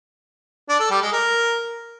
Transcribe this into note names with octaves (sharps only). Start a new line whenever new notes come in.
D4
A4
G3
G#3
A#4